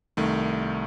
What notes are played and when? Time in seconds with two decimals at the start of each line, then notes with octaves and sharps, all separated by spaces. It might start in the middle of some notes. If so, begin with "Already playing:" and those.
0.17 C2 D#3 A3